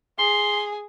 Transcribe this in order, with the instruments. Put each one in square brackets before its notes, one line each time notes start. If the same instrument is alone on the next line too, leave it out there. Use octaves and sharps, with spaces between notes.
[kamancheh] G#4 [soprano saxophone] C6